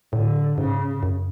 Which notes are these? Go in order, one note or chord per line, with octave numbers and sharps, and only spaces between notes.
A2 D3
G#2 C#3
F#2